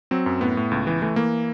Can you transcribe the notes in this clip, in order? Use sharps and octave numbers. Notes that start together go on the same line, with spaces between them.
F#3 C4
F#2
A2 B3
A2
C#2
E3
E3 A3
E3 A#3